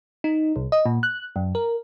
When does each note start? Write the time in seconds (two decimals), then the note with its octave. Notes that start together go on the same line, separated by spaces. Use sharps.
0.24 D#4
0.56 C2
0.72 D#5
0.86 A#2
1.03 F#6
1.36 F#2
1.55 A#4